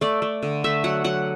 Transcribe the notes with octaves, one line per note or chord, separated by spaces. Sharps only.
A3 D5
A3
D3
A3 E5
F#3 F#5
F#3 F#5